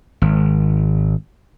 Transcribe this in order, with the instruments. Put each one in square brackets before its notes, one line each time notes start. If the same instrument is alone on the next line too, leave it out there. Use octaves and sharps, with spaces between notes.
[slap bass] G#1